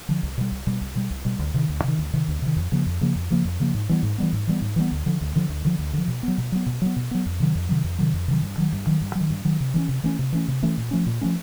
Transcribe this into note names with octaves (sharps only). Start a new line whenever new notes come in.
D3 F3
C2
B2 G3
C2
B2 G3
C2
B2 G3
C2
B2 G3
D2
C3 D#3
D2
C3 D#3
D2
C3 D#3
D2
C3 D#3
F2
C#3 F3 A#3
F2
C#3 F3 A#3
F2
C#3 F3 A#3
F2
C#3 F3 A#3
G#2
E3 G3 B3
G#2
E3 G3 B3
G#2
E3 G3 B3
G#2
E3 G3 B3
D2
D3 F3
D2
D3 F3
D2
D3 F3
D2
D3 F3
B2
F#3 B3
B2
F#3 B3
B2
F#3 B3
B2
F#3 B3
F2
C3 D#3 F#3
F2
C3 D#3 F#3
F2
C3 D#3 F#3
F2
C3 D#3 F#3
G2
D#3 F#3
G2
D#3 F#3
G2
F#3
D#3
G2
D#3 F#3
C3
E3 A3 C#4
C3
E3 A3 C#4
C3
E3 A3 C#4
C3
E3 A3 C#4
A#2
F3 A3 C#4
A#2
F3 A3 C#4